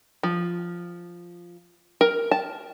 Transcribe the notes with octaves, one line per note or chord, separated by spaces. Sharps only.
F3
A#4
A5